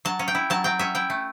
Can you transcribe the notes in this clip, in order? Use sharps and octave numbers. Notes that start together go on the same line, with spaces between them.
F#3 A5
C#4
G5
E4
F#3 A5
F#3 G5
C#4 E5
E4 G5
A3